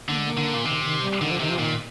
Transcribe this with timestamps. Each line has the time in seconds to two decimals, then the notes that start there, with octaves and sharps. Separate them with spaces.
0.09 D3 A#3
0.18 G#3
0.27 A#3
0.37 D3
0.54 A#2
0.65 C3 D#3
0.84 D#3
1.02 G3
1.20 D3 D#3
1.31 F3
1.40 C3 D#3
1.49 F3
1.58 A#2 D#3